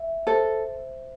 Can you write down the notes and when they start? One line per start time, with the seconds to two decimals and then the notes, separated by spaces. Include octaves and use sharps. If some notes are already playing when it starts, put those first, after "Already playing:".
Already playing: E5
0.27 A4 C5